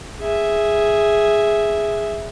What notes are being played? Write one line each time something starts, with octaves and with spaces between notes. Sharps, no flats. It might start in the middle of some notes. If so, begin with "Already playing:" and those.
G#4 E5